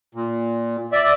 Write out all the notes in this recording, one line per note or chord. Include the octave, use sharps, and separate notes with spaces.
A#2
D5 E5